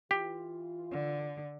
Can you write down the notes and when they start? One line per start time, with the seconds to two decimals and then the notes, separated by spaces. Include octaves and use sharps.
0.11 E3 F4 G4
0.91 D3